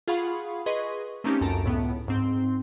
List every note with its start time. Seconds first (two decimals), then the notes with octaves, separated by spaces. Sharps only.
0.08 F4 G#4 F5 F#5 B5 C#6
0.66 G#4 B4 D#5 C6 C#6
1.24 A3 A#3 C4 C#4 D#4 G4
1.41 C#2 F#2 A4 A5 A#5 D7
1.64 C#2 A2 B3
2.08 G#2 C4 C6